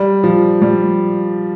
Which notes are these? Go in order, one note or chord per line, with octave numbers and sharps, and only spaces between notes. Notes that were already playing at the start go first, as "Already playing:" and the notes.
Already playing: G3
F3
G3